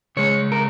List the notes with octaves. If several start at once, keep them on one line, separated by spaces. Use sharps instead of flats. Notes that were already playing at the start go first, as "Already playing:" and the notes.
C#3 G#3 C#5
A#4